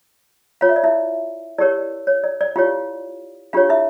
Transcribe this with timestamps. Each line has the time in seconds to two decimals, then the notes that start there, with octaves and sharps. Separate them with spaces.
0.61 F4 C#5 F5
0.69 E5
0.76 D5
0.84 E4 E5
1.58 E4 G4 A#4 C#5 D5
2.07 C#5
2.24 D5
2.41 D5
2.56 E4 F4 G4 C#5 F5
3.53 D4 F4 G4 C#5 F5
3.69 E4 E5